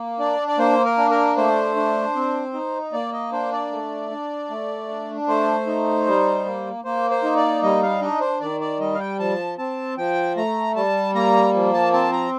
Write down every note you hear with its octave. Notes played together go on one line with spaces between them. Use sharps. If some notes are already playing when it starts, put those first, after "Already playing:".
Already playing: A#3
D4 D5
D5
A#3 C5
A#4
D4
A#4
A3 C5
D4
C4
D#4
A#3 D5
D#5
D4 C5
D5
A3
D4
A3
D4
A3 C5
D#4
G3
A#3
A#3 C5
C5
D#4
D5
G3 D#5
F5
D4 D#5
C5
D#3 D5
D5
G3 D#5
F5
G5
F3 A5
C4 A5
F3 G5
A3 A#5
G3 A5
A#3 A#5
F3
A5
C4 A5
A#5